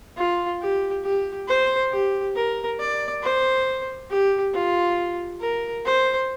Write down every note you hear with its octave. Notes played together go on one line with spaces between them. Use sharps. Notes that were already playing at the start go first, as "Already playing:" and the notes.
F4
G4
G4
C5
G4
A#4
D5
C5
G4
F4
A#4
C5